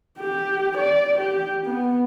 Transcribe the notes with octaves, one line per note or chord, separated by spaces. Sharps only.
G4
D5
G4
B3